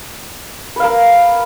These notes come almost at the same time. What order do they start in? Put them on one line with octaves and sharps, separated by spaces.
B4 F5 A#4